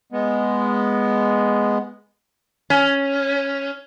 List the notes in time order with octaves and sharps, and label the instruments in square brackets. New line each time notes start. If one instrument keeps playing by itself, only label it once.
[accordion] G#3 B3
[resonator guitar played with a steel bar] C#4